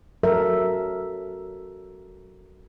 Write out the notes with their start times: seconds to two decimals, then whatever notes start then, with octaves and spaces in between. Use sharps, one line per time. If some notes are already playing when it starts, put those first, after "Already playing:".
0.23 F#3 A4 A#4 E5